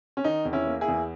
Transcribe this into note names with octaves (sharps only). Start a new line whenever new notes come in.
C#4
D#3 D#4
E2
C#4 E4
A#3
E4 G#4
E2